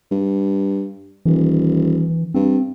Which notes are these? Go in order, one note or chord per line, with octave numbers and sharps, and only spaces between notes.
G2
D#1 E3
G2 C4